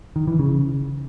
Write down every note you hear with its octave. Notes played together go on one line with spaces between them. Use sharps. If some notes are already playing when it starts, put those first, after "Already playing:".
D#3
E3
C#3